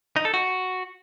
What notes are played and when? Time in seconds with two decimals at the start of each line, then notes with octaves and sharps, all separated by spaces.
0.16 D#4
0.25 A4
0.34 F#4